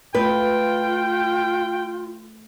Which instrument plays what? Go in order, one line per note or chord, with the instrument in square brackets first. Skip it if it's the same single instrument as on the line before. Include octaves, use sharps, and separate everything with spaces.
[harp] A3 [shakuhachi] F4 [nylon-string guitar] B4 [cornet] G5